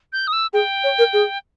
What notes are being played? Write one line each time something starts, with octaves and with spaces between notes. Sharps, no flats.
G6
D#6
E6
G#4 G5
C#5
A#4
G#4